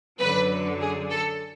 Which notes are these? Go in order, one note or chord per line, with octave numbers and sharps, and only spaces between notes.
F#2 D3 F#3 B4
G#4
A4